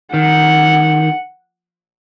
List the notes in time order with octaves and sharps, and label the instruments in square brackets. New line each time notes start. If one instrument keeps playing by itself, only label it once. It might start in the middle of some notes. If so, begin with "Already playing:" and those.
[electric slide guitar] D#3 [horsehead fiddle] F#5